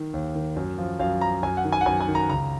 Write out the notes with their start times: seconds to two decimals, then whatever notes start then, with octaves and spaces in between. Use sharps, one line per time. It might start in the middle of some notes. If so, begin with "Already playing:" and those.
Already playing: D#3
0.13 D#2
0.35 D#3
0.56 F#2
0.78 F3
0.99 F#2 F5
1.21 F3 A#5
1.43 F#2 G#5
1.57 F#5
1.65 D#3
1.72 G#5
1.81 F#5
1.86 F#2 G#5
2.01 G#5
2.08 D#3
2.15 A#5
2.29 C#2 A#5